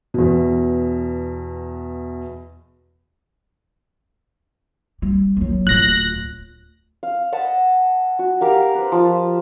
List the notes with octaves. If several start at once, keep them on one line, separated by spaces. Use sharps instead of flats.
E2 B2
G3
D#2 F#3
D1 F4 F#6 A#6
F5
D#5 F#5 A5 B5
F#4
G4 A#4 F5
B4 C5
F3 A5 B5